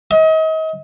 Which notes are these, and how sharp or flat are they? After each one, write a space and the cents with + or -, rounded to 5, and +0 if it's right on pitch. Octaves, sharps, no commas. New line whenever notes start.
D#5 +35